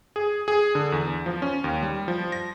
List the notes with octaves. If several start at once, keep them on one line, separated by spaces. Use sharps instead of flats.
G#4
G#4
D3
E2
F3
C#4
D#2
G3
F3
A#6